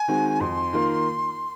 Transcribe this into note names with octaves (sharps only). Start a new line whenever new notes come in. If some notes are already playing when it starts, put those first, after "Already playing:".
Already playing: G#5
D#3 G#3 C4 F#4
F2 C6
D#3 A#3 F4 A#4